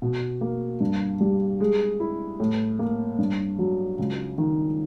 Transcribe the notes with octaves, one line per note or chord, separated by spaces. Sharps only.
B2
A#3
G2
G3
G#3
E4
A2
A#3
G2
F#3
C#2
D#3